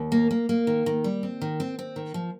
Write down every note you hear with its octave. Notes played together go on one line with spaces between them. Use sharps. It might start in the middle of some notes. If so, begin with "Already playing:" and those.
Already playing: D#2
A#3
A#3
A#3
D#3
D#3
G3
C4
D#3
C4
C4
D#3
F3